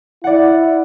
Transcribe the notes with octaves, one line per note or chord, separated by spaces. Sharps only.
E4 D5 F#5